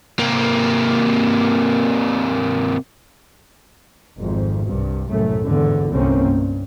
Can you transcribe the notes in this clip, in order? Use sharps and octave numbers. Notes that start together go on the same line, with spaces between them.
C3 A#3
G#1 F2
C2 G2
C2 F#2 A2 A3
G#1 E2 D3
G1 C2 D3 A#3 C4 C#4
G2